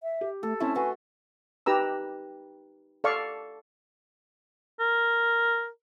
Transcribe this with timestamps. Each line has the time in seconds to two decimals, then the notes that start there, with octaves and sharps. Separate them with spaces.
0.03 E5
0.21 G4
0.43 A3 A4
0.60 A3 C4 C#4 E4 A5
0.76 F#4 B4 G#5 C6
1.66 D#4 G4 B4 A#5 E6
3.04 A4 D5 F5 C#6
4.80 A#4